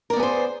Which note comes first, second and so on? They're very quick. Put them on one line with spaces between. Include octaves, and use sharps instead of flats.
A#4 D5 B3 G#4 C5